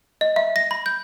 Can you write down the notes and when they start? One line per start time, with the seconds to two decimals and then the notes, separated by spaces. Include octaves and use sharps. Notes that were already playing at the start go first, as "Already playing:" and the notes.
0.21 D#5
0.36 E5
0.56 A#6
0.71 B5
0.86 G6